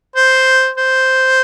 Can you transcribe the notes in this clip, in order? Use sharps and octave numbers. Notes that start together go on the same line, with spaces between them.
C5
C5